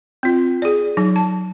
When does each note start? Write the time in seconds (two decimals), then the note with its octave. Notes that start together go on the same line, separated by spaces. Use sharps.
0.23 C4 F4
0.62 G#4 D5
0.97 F#3 D#4
1.16 A5